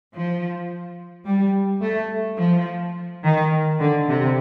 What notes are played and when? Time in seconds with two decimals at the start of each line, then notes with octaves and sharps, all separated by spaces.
0.13 F3
1.25 G3
1.82 A3
2.38 F3
3.24 D#3
3.80 D3
4.09 C3